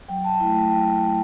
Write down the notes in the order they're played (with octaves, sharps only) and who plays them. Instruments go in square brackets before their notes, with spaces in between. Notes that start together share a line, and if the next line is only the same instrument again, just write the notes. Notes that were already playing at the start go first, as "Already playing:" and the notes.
[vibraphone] F#3 G5
A5
A3 E4 G5
G5
F#3 G5